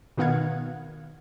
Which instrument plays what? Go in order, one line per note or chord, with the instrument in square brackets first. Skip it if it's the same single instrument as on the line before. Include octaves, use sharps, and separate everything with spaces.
[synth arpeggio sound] B2 D#3 B3 F5 F#5 G#6